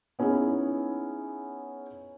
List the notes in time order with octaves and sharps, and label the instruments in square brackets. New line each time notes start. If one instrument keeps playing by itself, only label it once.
[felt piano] B3 C#4 D#4 E4 G#4